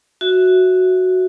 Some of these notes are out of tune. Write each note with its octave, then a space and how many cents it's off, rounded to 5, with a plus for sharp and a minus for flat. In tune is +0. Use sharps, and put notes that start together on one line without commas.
F#4 +0 E5 +0